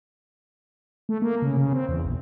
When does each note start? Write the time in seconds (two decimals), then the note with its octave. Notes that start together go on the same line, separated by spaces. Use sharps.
1.09 A3
1.22 A#3
1.42 C#3
1.57 C#3
1.73 C4
1.89 E2
2.05 A#1